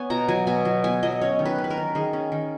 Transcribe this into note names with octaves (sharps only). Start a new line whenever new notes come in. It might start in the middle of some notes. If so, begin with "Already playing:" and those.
Already playing: B3 C#5 G#5
B2 A#5
F#3 G#5
B2 G#5
F#3
B3 G#5
F#3 D#5
C#4 C#5
D#3
B4
C#4
B4
A#4
D#3
D#3 G#4
C#4
D#3